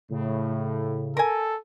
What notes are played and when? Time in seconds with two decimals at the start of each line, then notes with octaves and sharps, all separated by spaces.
0.11 A2 C#3
1.17 A4 A#4 G#5